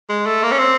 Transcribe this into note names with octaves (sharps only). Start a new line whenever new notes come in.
G#3
A3
A#3
C#4
C4